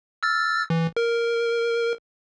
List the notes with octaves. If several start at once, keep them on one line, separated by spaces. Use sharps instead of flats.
E6 F6 A6
E3
A#4